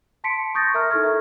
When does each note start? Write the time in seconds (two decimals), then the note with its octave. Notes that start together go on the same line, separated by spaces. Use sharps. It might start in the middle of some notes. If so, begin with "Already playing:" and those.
0.24 A5 C6 B6 C#7 D7
0.55 C#6 D#6 G6 A6 A#6
0.74 A#4 E5 A#5 F6
0.91 D#4 E4 A4 C#6 F6 G#6
1.04 A4 E5